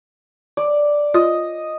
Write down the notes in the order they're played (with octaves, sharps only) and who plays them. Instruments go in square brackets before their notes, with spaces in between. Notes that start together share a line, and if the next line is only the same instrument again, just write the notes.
[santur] D5
[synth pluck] F4 [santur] D#5